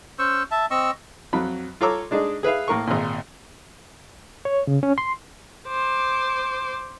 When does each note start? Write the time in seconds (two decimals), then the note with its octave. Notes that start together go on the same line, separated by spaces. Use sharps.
0.19 C#4 C5 C#6 E6
0.51 E5 A5
0.71 C4 D#5 C#6 E6
1.33 F2 F#3 B5
1.81 F4 A4 C#5 A#5 D6 E6
2.11 G#3 D4 D#4 G#4
2.43 G#4 B4 E5 F5
2.68 A2 A#3 A#4 C#6
2.87 G#1 A#2
4.45 C#5
4.67 C#3
4.83 C#4
4.98 C6
5.68 C5 D6